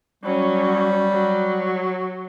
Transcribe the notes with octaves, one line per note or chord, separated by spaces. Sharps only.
F#3 G3 C#4
F#3